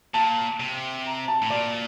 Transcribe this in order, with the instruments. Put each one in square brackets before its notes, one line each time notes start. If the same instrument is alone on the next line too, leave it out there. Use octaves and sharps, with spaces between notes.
[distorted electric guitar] A#2 [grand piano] A5
[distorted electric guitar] C3
[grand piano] A#5
A5
[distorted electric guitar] A2
[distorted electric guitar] A#2 [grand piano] D5